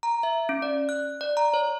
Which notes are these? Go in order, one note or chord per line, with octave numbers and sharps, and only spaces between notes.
A#5
E5
C#4
D5
F#6
D5
A#5
C#5